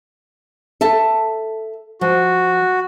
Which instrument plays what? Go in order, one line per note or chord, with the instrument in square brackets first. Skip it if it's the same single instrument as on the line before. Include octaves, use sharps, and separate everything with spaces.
[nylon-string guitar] A4 E5 A5
[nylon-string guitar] F3 [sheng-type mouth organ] F#4